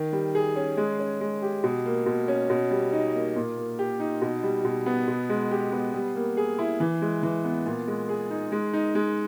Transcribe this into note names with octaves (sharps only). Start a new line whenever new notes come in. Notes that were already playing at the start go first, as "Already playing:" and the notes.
Already playing: D#3
G3
G#4
C#4
G#3
C#4
G#3
G4
B2
A#3
B2
C#4
B2
G3
D#4
A#3
A#2
A#3
G4
D#4
B2
G3
B2
B3
B2
G#3
G4
B3
G3
A#3
G#4
E4
E3
G#3
E3
B3
A#2
G#3
G#4
D#4
G#3
D#4
G#3